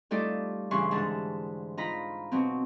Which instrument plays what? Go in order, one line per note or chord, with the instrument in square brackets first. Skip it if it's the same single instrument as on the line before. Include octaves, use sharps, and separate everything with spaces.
[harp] G3 A3 D#4 F4 A4 D5
G2 C#3 E3 C6 C#6
G#2 D3 E3 A5
D#4 F4 A#5 B5
B2 F#3 C4